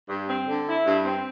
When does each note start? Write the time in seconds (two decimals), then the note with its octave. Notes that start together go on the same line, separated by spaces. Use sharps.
0.09 G2
0.28 C4
0.48 D3
0.67 E4
0.85 G2
1.05 C4